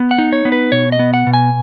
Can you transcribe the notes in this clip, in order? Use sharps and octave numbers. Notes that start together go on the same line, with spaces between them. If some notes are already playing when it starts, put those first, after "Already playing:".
Already playing: B3
F#5
D#4
C#5
B3
B4
B2 C#5
D#5
B3
F#5
B2
G#5